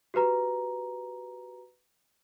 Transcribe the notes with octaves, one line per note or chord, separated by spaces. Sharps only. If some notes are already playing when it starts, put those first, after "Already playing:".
F#4 G4 B4 A#5